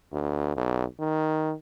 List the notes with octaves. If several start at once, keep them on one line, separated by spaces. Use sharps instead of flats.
D2
B1
D#3